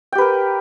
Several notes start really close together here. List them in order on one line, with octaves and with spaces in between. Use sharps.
G5 G4 B4 A#4